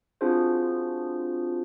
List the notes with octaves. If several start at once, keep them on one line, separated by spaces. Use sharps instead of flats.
C4 D4 F4 F#4 G#4 C5